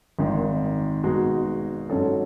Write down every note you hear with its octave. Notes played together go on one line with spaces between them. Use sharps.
G#1 G#2 D#3
B2 G#3 D#4 F#4
G#2 F#3 C#4 F#4 A4